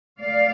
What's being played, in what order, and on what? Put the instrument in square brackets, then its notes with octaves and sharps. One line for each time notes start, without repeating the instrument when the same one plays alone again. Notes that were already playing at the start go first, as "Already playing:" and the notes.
[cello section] A2 A3 D5 F5